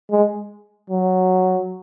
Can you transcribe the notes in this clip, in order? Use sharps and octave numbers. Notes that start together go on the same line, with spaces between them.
G#3
F#3